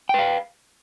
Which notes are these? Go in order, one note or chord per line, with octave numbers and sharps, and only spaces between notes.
B4 F5 G5